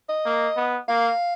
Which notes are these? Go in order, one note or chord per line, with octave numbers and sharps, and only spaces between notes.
D#5
A#3
B3
A#3 F5